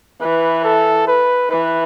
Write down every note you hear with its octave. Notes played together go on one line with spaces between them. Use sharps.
E3 B4
A4
B4
E3 B4